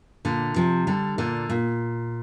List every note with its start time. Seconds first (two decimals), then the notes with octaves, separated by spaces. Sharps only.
0.25 A#2 D3
0.56 C3 F3
0.87 D3 G3
1.18 A#2 D3
1.50 A#2